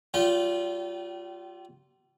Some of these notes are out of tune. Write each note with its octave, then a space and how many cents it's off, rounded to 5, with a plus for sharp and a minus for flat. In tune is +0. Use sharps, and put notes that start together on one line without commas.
G3 -40 F4 +0 G5 -25